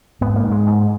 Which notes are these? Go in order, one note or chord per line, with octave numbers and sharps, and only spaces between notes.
G#2 B3
A#3
G#2
G#3
G#2